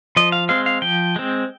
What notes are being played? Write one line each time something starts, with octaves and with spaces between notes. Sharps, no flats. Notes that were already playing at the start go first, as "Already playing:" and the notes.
F3 D#5
F5
G#3 C4 F5
F5
F3 G5
G#3 C4